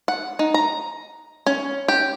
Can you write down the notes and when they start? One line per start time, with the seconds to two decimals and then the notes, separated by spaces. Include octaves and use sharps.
0.08 F#5
0.39 D#4
0.54 A#5
1.47 C#4
1.88 G4